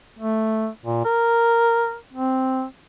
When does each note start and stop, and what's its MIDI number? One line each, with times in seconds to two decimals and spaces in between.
0.19 0.68 57
0.85 1.00 46
1.05 1.96 70
2.13 2.64 60